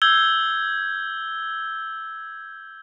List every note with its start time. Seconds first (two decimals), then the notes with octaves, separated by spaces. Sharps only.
0.02 E6 G6 G#6 G7